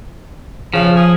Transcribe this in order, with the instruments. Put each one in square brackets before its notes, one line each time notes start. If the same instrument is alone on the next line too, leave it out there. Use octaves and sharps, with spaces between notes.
[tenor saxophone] C#3 [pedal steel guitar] F3
[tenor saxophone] G#4